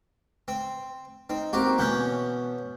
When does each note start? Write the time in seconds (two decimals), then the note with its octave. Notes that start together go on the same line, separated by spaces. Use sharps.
0.48 C4
1.30 C4 D#4
1.53 A#3 C4 F#4 G4 A#4
1.78 B2 E3 B3 C#4 F#6 G6